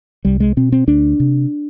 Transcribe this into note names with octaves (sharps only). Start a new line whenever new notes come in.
C2 G3
G#3
B2 C4
C4
D2 D4
C3